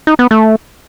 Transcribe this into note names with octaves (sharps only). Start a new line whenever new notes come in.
D#4
B3
A3